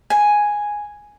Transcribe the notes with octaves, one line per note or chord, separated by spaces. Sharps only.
G#5